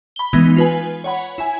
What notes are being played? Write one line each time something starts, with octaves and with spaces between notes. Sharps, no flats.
B5 G7
E3 G#3 B3 D#4
F4 B4 G#5
C#5 F#5 B5
E4 G#5